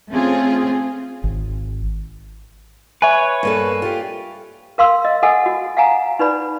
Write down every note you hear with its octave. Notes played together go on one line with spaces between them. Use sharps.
A3 C4 C#4 F4 G#4
G#1
B4 C#5 E5 G#5
G2 A#3 A4
F4 G4
A#4 F5 C6 E6
D#5
A4 D#5 F#5 G#5 E6
F#4
F5 F#5 G#5 A#5
D#4 B4 D5 B5